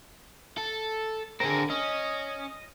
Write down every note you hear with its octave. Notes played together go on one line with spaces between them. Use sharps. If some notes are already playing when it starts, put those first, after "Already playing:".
A4
D3 C4 G#4 A#4
C#4 D#5